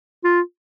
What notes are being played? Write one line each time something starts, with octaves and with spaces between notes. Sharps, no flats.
F4